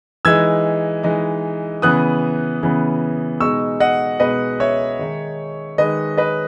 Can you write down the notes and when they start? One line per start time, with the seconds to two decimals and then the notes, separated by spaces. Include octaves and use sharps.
0.25 E3 G#3 D#4 E6 G#6
1.03 E3 G#3 D#4
1.82 C#3 E3 B3 D#6 F#6
2.63 C#3 E3 B3
3.40 B2 G#3 D#4 C#6 E6
3.80 D#5 F#5
4.20 B2 G#3 D#4 B4 D#5
4.60 C#5 E5
4.99 D#3 G#3 D#4
5.78 D#3 G#3 D#4 B4 D#5
6.17 B4 D#5